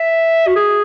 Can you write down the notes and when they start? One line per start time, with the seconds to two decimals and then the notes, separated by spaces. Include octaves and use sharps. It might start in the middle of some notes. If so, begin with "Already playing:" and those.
Already playing: E5
0.47 F#4
0.56 G#4